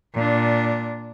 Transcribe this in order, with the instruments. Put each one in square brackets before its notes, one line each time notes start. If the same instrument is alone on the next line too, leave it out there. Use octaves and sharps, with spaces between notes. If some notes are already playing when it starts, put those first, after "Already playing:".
[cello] A#2 D4